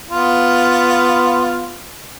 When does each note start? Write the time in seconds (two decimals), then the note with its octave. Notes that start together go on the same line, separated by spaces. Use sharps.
0.11 B3 F4